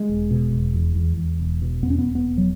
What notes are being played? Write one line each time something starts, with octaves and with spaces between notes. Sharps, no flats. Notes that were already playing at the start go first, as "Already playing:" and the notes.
Already playing: G#3
E1
B2
E1
E2
E2
E2
E1
B2
E2 B3
C#4
B3
E1
B3
E1
F#3